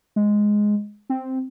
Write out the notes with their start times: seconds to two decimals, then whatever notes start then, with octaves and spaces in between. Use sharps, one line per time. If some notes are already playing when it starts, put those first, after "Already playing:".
0.16 G#3
1.10 C4